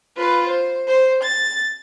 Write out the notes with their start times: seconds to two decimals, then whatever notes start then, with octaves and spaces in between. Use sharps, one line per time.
0.17 F4 B4
0.47 C5
0.88 C5
1.23 A6